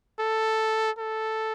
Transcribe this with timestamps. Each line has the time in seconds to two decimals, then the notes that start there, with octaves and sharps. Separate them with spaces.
0.19 A4
0.98 A4